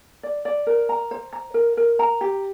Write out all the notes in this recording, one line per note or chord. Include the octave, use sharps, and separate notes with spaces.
D5
D5
A#4
A#5
C5
A#5
A#4
A#4
A#5
G4